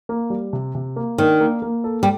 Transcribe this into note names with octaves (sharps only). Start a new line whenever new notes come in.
A#3
G3
C3
C3
A#3
D#3 D4
A#3
A#3
A4
G3